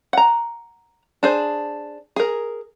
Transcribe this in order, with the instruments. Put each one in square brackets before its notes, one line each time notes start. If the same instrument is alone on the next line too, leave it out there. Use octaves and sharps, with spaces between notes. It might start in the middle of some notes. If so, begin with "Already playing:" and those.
[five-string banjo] F#5 A#5
D4 G#4 C5
G#4 A#4